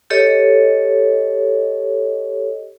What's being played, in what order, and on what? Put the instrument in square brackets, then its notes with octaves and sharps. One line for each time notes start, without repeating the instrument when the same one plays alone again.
[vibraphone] G4 A4 C#5 D#5